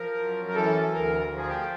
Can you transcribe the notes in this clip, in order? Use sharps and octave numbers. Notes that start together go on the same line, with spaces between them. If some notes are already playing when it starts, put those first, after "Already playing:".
Already playing: F3 A#4
F#2
A#4
E3 A4
A4
D2 A#4
F3
G#4
G4